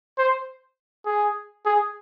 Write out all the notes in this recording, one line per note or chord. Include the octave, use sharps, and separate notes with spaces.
C5
G#4
G#4